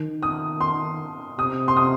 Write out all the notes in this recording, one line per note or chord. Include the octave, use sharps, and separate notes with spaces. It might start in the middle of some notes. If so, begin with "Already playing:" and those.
Already playing: D#3
D#6
C6
C3 D#6
C6
D#6